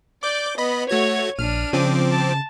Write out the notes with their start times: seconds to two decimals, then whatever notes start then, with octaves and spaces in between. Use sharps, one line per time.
0.23 D5 D6 G6
0.58 B3 D#5 B5
0.89 A3 F#4 C#5 G#6
1.39 A#1 D4 F6 D#7
1.73 C#3 F3 C4 D6
2.12 A5